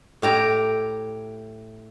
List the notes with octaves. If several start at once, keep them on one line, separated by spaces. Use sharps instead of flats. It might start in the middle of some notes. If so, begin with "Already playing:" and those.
A2 G4 A#5